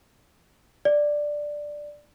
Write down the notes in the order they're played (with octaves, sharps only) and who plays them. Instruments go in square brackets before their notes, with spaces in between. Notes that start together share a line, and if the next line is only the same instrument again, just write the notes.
[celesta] D5